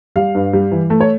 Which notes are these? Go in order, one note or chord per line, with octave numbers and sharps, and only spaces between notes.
G3 F5
G2
G3
E3
A3
C#5